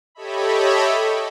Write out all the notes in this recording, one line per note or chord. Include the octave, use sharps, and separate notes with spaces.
G4 A4 C#5 D#5 E5 B5